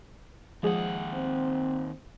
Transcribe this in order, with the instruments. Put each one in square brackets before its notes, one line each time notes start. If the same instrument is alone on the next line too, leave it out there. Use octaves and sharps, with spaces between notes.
[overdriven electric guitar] D#2 F#5 [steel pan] F3 G#3 G#4
[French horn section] C4